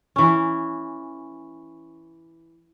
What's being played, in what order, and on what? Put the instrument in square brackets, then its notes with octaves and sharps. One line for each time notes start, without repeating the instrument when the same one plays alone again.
[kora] E3 C#4